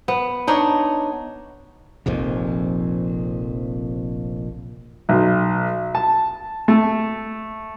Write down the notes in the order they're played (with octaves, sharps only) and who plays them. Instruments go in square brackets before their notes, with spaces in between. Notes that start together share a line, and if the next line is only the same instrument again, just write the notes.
[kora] B3
D4 D#4 C#5
[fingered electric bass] F1 A#1 F2
[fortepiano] B1
A5
A3